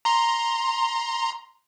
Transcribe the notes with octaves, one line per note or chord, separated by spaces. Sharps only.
A#5 C6